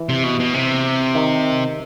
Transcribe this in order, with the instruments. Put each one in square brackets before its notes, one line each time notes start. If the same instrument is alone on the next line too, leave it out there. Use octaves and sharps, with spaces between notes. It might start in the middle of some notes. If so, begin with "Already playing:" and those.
Already playing: [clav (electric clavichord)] E3
[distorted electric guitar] C3
B2
B2
C3
[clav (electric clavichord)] D#3